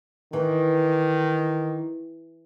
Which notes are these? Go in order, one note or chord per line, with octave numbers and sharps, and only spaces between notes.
D#3 E3